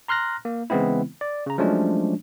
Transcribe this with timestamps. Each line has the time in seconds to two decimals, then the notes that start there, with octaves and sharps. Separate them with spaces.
0.08 A#5 C6 F6 F#6 A#6
0.45 A#3
0.70 C#3 E3 G#3 B3 C4 E4
1.21 D5
1.46 C#3 A#5
1.58 F3 F#3 G#3 A3 C#4 D4